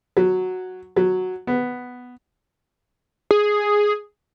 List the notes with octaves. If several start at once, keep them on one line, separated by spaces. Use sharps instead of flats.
F#3
F#3
B3
G#4